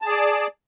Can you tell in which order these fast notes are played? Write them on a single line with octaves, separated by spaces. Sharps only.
A5 G#4 D5